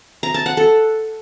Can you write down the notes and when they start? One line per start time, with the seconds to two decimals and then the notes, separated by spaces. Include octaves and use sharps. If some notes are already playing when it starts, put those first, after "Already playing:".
0.23 A#5
0.34 A5
0.46 F#5
0.57 A4